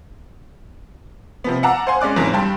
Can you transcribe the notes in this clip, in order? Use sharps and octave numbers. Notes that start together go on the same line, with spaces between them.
C3 F3 B3
F5 F#5 A5 A#5 D6 E6
C5 F5 F#5 G#5 C6
G#3 C#4 D5 D6 F#6
B1 E2 G#2
G2 G3 G5 A5 C6